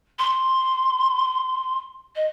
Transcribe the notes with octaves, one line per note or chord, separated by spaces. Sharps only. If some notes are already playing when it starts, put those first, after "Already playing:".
C6
D#5